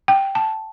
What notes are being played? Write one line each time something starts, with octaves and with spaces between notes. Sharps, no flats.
G5
A5